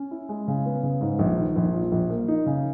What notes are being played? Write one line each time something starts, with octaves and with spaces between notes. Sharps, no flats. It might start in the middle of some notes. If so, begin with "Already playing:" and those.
Already playing: C#4
E4
G#3
C#3
B3
C#3
G#2
A#1
D#3
A#1
A#2
A#1
A#3
D#4
C#3